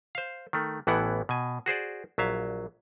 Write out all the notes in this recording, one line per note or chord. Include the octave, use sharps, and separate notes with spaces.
C5 F5
D#3 A3
A1 A2 E3 B3 E4 F#5
B2 G#5
F#4 G#4 C5 D5
A#1 F#3 E5 F5